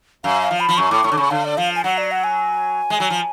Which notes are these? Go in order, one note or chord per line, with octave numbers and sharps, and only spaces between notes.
F#2 F5
F5
F3
B5
F3
F#2 C#6
A2 D6
A2 C#6
D3 D6
C#3 C#6
D3 F5
D5
F3 F5
G#5
F#3 F#5
D5
F#5
G#5
G#3
F#3
F3